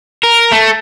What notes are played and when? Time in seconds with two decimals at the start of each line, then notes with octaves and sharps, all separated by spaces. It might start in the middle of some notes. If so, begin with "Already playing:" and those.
0.23 A#4
0.52 A3